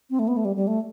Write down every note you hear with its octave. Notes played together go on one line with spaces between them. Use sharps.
C4
A3
B3
A3
G3
G3
A3